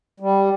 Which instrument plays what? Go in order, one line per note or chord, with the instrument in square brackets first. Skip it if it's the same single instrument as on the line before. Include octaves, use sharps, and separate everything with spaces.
[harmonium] G3